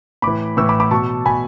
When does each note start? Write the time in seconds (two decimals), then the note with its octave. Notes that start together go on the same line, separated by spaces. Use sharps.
0.22 A2 E3 B5 D6
0.57 A2 E3 C#6 E6
0.69 B5 D6
0.80 B5 D6
0.91 B2 A5 C#6
1.26 B2 G#5 B5